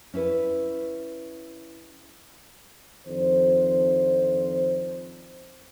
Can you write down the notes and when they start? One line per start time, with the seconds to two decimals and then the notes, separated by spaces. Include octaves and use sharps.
0.14 C#4 E4 B4
3.07 F2 D#3 D4 C5